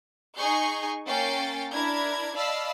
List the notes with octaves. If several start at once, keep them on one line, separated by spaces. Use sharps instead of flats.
D#4 G#4 G#5 C#6 G6 C7
A#3 C#4 G5 A6 C7
D4 E4 A#4 B5 G#6
D5 D#5 F5 A5 B5 E6